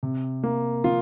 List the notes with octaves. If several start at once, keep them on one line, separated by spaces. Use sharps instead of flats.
C3
A#3
F3 F4